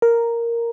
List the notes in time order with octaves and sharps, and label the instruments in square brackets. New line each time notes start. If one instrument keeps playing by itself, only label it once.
[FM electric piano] A#4